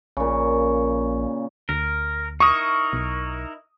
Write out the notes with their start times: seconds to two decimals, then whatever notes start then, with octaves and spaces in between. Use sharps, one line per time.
0.17 A#1 A#2 C#3
1.69 D2 A#4
2.40 D#4 E4 A#4 C#6 D#6
2.93 B1